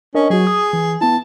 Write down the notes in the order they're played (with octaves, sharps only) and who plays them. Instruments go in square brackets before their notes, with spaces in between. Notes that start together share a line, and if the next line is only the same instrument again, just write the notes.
[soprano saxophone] C#4 [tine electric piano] D4 A#4 D#5
[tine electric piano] F#3 F#4 [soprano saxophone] G#4
[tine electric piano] D#6
E3
[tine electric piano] B3 E4 [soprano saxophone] A5